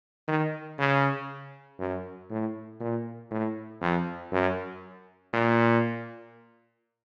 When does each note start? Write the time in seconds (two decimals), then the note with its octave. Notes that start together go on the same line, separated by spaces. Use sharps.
0.28 D#3
0.79 C#3
1.79 F#2
2.30 A2
2.80 A#2
3.31 A2
3.81 F2
4.32 F#2
5.33 A#2